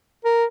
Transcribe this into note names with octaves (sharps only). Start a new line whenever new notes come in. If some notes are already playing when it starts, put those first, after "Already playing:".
A#4